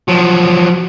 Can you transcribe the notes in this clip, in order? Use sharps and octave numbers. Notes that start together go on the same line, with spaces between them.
F3 F#3